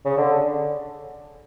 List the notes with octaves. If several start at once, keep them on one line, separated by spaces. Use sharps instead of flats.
C#3
D3